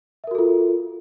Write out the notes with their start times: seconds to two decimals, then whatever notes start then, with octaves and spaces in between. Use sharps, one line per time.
0.24 E5
0.27 A#4
0.31 F#4
0.35 A4
0.38 F4